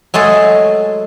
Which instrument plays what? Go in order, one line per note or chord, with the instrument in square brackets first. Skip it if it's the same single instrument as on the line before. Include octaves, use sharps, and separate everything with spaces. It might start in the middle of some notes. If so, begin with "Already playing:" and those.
[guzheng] F#3 G#3 A3 G#4 A4